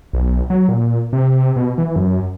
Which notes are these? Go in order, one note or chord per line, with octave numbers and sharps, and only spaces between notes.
B1
F#3
A#2
C3
B2
E3
F#2